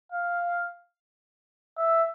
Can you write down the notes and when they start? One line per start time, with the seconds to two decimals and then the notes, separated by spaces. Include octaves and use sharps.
0.12 F5
1.78 E5